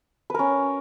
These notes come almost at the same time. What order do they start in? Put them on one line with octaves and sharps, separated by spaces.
B4 A#4 C#4